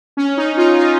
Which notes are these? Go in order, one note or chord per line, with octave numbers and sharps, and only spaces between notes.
C#4
D#4
F4
D#4